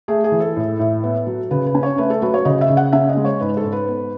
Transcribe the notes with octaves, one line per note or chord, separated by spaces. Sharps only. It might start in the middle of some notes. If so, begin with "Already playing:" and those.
A3 G#4
G#4
E3
A4
A2
A2
B3
F#3
C#3 B4
B4
C#4
C#5
A3 B4
A4
F#3 B4
C#5
C#3 D#5
E5
C#3
F#5
C#4 E5
D#5
G#3
C#5
G#2 B4
A4
G#2
B4
B3